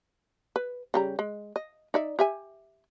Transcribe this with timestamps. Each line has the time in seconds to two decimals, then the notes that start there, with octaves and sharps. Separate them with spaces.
0.56 B4
0.94 C#3 G3 A#5
1.19 G#3
1.56 D#5
1.94 D#4 D5 E5
2.19 G4 E5 G#5